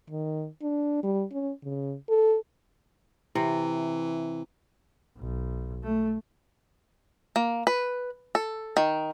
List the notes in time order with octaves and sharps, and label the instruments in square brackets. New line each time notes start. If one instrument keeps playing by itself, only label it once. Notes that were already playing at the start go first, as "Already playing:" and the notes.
[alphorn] D#3
D4
G3
C#4
C#3
A4
[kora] C3 [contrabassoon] E3
[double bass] B1
A3
[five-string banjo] A#3
B4
A4
D#3